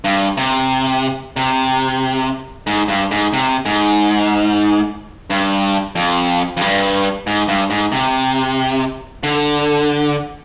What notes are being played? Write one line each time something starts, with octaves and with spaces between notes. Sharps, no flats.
G2
C3
C3
G#2
G2
G#2
C3
G#2
G2
F2
F2
G2
G#2
G2
G#2
C3
D3